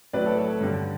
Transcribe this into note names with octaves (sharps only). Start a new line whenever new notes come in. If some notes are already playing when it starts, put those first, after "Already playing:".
A2 F#3 B4 D5
A4 C#5
A4 C#5
G2 D3 G3